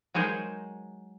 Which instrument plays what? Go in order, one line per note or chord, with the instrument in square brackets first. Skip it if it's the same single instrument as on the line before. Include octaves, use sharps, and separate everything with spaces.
[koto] F#3 G#3 D#4 G#4 A#4 C5